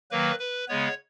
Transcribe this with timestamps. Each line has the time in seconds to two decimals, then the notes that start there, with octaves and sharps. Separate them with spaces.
0.11 D#3 F#3 A#3 B4
0.39 B4
0.69 C#3 G#3 B3 C#5